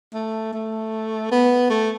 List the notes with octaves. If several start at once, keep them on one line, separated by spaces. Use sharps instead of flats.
A3
A3
B3
A3